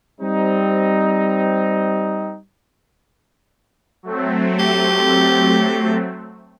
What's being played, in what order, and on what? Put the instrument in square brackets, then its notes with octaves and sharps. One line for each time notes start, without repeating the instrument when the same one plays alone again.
[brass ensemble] G3 C4 D#4
[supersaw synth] F#3 A3 C4
[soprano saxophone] G4